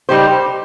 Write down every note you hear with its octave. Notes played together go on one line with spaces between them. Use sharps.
G3 D#4 G4 C5